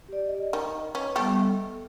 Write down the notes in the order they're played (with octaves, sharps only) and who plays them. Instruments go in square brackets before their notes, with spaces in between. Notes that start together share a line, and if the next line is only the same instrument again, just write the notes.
[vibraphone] G4 D5
D#5
[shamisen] D#3
[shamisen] C#4 [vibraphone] B4 D#5
[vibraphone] G3 B3 [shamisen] A3 G4
[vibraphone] A4